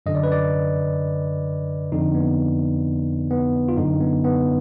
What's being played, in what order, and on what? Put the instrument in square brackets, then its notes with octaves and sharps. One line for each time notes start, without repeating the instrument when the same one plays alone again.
[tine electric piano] F#2 D3 D#5
D5
B4
D5
F2 D3 D#4
B3
B3
F4
F#2 D3 D#4
B3
B3